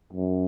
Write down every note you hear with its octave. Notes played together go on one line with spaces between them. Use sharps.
F#2